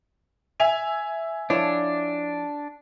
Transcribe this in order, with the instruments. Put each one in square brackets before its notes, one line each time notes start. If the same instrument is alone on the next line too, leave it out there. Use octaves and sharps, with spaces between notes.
[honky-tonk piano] E5 G#5 F7
[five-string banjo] F3 E4 C#5 [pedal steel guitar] D4